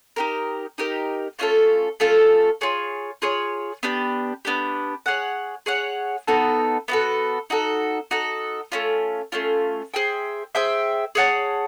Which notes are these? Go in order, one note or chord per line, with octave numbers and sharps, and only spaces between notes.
D#4 G4 A#4
D#4 G4 A#4
A3 C#4 F4 A4
A3 C#4 F4 A4
F4 G#4 C#5
F4 G#4 C#5
B3 D4 G4
B3 D4 G4
G#4 C#5 F#5
G#4 C#5 F#5
B3 D#4 F#4 A4
B3 D#4 F#4 A4
D#4 F#4 A4
D#4 F#4 A4
A3 C#4 F4
A3 C#4 F4
G#4 C5 E5 G5
G#4 C5 E5 G5
G#4 C#5 F#5 A5